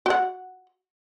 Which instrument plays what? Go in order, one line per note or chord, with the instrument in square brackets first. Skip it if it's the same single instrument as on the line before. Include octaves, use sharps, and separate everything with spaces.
[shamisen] F#4 F#5